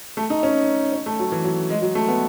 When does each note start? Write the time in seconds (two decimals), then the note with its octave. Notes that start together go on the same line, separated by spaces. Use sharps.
0.17 A3
0.30 D#4
0.43 C#4
0.93 C#4
1.06 A3
1.19 F#3
1.32 E3
1.44 F#3
1.70 G#3
1.82 F#3
1.95 A3
2.08 B3